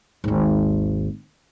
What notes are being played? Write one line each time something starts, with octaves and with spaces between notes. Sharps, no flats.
G#1 D#2